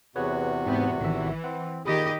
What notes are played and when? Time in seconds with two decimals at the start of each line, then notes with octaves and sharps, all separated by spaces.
0.16 E2 C3 F#4 G#4 B4 C#5
0.66 G#2 B3 C4 C5
1.00 A1 D#3 E3 E5
1.44 C4 F#5
1.85 A#2 D#3 G4 G#4 D#5 B5 D#6